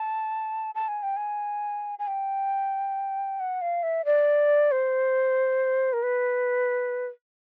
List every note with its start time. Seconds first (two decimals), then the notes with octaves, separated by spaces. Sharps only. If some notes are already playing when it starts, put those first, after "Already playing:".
Already playing: A5
0.75 A5
0.88 G#5
1.03 G5
1.17 G#5
1.99 G#5
2.07 G5
3.40 F#5
3.61 F5
3.83 E5
4.05 D5
4.72 C5
5.93 A#4
6.03 B4